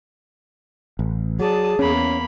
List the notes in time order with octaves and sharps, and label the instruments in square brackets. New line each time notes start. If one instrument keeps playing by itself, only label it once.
[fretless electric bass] A1
[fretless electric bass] F#3 [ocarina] G#4 [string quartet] D5 A5 D#6
[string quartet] E2 A#3 B5 [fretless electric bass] C#4